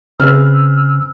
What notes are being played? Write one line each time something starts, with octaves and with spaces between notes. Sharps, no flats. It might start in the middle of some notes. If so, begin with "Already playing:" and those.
C#3 C4 G#4 B4 E6 F6